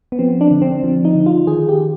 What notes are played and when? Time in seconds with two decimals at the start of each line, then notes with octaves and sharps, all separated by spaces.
0.12 B3
0.19 F3 C4
0.41 D4
0.51 D3
0.62 C4
0.84 F3
1.05 D#4
1.15 D3
1.26 F4
1.47 D#3 G#4
1.69 G4